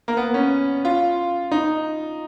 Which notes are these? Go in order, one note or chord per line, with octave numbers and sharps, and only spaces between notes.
A#3
B3
C#4
F4
D#4